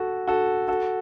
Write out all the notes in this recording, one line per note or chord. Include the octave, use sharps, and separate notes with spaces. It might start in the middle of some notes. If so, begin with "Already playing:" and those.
Already playing: F#4 A4
F#4 A4
F#4 A4